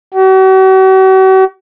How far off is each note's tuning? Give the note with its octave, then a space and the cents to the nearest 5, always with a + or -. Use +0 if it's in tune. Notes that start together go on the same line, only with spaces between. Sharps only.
F#4 +45